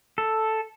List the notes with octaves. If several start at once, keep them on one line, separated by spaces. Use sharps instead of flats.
A4